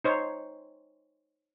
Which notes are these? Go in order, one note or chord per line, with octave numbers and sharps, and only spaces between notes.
D#4 C5 C#5